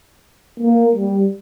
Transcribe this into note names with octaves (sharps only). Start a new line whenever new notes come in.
A#3
G3